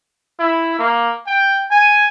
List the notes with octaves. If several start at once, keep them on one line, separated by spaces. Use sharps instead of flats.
E4
A#3
G5
G#5